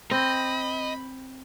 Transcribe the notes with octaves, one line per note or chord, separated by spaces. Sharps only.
C4 D#5 B5